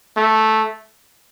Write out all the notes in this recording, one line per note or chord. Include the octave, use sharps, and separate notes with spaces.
A3